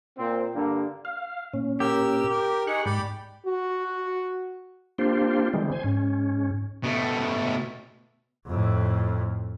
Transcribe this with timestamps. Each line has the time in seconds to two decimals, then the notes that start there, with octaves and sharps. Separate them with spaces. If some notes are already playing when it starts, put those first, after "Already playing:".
0.18 A#2 C4
0.54 G2 D3 G3 A#3
1.05 F5
1.53 A#2 C#4
1.80 G4 A#4 E6
2.30 A#4 G5
2.67 D#4 G#4 C#6 F#6
2.86 G#2 D5 G5 B5
3.46 F#4
4.98 A#3 C4 D4 F4 G4 C5
5.53 D3 E3 G3 G#3 C4
5.72 C5 G#5
5.84 G#2 C#4
6.83 B2 A3
8.47 F2 A2